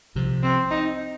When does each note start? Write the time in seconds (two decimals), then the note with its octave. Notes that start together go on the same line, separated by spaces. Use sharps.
0.15 C2 C3 F3
0.43 C4
0.71 D#4